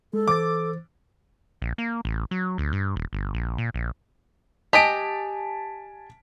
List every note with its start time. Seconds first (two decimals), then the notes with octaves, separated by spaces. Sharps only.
0.13 G#3 A4
0.28 E3 C5 D6 A6
1.62 A#1
1.78 A#3
2.05 A1
2.31 F#3
2.58 D2
2.73 G2
2.96 D#1
3.13 G1
3.34 A#1
3.58 A#2
3.74 A#1
4.73 G4 D#5 G#5 A5 B6 D7